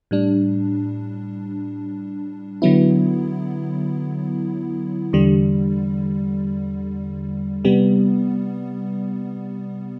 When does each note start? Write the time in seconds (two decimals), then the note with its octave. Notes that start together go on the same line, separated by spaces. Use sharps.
0.11 A2 G3 D4
2.62 D3 F#3 B3 E4
5.13 E2 D3 G3
7.65 C3 G3 B3